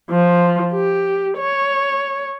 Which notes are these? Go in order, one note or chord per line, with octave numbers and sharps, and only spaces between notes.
F3
G4
C#5